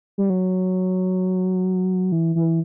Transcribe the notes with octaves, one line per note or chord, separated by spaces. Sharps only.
G3
F#3
E3
E3